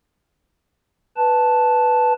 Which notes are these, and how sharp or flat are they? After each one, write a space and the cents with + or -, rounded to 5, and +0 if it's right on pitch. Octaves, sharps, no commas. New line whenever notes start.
B4 +0 A5 -5